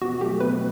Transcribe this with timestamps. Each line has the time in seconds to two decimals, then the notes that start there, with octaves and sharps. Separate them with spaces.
0.01 B2 F#4
0.21 F#3 A3 G4
0.40 B2 B4